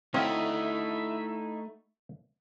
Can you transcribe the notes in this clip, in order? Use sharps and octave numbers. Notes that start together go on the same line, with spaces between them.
A3 C4 D#4 E4 F#4 C#5 E5 F5